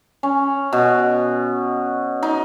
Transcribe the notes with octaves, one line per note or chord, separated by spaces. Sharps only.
C#4
B2
D#4